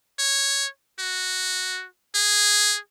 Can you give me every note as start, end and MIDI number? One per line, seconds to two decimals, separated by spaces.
0.19 0.67 73
0.99 1.86 66
2.15 2.78 68